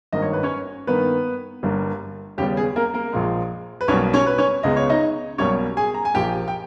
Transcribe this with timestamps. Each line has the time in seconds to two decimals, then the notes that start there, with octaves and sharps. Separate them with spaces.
0.12 G#1 G2 D#3 A#3 D#5
0.22 C#5
0.33 B4
0.43 C#4 C#5
0.87 G2 D#3 A#3 B3 B4
1.63 G1 G2 G3 A#3
2.38 D#2 C#3 G3 B3 G4
2.57 G#4
2.76 A#3 A#4
2.94 A#3 A#4
3.13 A#1 A#2 G#3
3.81 B4
3.88 B1 B2 G3 A#3 C#4 C#5
4.13 C#4 C#5
4.26 B4
4.38 C#4 C#5
4.63 C#2 C#3 G#3 B3 D#5
4.76 C#5
4.89 D#4 D#5
5.38 B1 B2 G3 A#3 C#4 C#5
5.77 G#4 G#5
5.94 A#5
6.05 G#5
6.14 A#1 A#2 A#3 G4 G5
6.48 G5